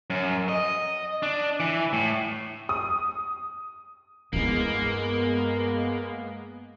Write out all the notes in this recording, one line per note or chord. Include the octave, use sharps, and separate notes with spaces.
F#2
D#5
D4
E3
A2
D#6
G2 G#3 A#3 B3 E4